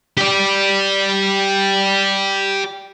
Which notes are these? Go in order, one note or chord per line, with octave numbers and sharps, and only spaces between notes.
G4 D5